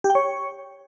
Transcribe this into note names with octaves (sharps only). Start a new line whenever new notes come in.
G4
G5
C#5